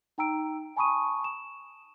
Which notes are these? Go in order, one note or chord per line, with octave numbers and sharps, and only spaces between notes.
D#4 G5 A#5 E6 D7
G#5 A5 B5 C#6 D#6 D#7
E7